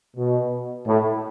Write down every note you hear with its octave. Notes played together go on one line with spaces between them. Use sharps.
B2
A2